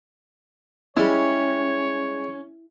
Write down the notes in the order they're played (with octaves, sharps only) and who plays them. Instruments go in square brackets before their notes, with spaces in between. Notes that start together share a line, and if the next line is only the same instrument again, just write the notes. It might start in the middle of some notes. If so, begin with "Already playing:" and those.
[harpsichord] G3 G#3 [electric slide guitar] C#4 [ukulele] E4 [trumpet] C#5